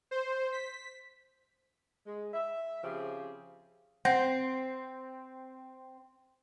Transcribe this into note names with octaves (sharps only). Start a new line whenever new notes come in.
C5
B6
G#3
E5
C#3 F3 C4 G4 G#4
C4 F#5 G6 A#6